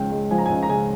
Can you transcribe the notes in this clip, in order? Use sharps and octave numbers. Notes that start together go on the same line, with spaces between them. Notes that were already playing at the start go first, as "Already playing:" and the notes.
Already playing: C#2 C#3 F3 G5
G#3
F3 G#5
A#5
C#2 G#5
A#5
C#3 G#5